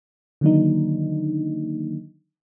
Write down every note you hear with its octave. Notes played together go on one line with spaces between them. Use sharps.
D3 D#3 F#3 A#3 D4 D#4